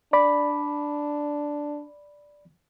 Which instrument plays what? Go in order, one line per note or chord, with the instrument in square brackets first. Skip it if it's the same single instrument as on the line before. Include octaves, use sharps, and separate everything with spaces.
[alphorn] D4 [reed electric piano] D5 B5